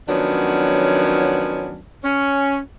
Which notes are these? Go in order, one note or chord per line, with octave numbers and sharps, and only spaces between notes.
D#3 F3 F#3 B3 C#4 D4
C#4